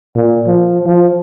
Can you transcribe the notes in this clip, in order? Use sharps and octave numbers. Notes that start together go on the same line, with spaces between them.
A#2
F3
F3